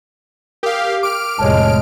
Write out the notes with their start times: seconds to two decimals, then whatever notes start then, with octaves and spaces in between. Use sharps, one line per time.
0.63 G4 A#4 F5
1.03 D6 F6 D7
1.39 F1 A2 G#3 C#5 A5